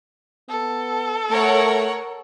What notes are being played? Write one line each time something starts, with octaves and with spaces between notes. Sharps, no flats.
B3 A4
A3 A#4 C#5 F#5